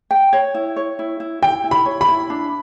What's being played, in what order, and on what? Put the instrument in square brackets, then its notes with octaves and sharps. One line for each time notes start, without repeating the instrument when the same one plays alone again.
[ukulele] G5
C#5
E4
C#5
E4
E4
[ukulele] E4 [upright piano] G5
[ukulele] E4
[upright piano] B5
[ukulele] C#5
[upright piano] B5
[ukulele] E4
D4